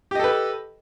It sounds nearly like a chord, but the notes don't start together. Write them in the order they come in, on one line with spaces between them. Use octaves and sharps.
G4 D#5 A4 B4